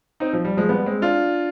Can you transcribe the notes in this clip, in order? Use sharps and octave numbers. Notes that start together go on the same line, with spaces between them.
C4 D#4
F3
G3
F3 G#3
G3 B3
G#3 C4
D4 F4